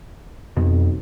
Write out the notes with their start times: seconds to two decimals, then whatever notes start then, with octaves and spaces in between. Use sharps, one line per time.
0.57 B1 F2